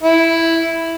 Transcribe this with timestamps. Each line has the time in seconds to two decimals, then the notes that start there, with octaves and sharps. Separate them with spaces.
0.03 E4